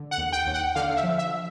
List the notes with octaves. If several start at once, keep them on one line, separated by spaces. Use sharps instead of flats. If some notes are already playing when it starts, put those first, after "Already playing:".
Already playing: D3
F#5
D#2
G5
D#2
F#5
D3 F5
E5
F3
E5